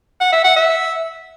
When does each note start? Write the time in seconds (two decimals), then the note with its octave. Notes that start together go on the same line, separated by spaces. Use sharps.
0.21 F#5
0.33 E5
0.44 F#5
0.56 E5